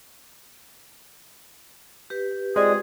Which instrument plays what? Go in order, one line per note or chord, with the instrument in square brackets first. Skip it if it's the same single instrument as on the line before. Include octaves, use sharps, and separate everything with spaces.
[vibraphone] G4 B4
[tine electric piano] G#3 [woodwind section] C4 F4 G#4 [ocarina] D5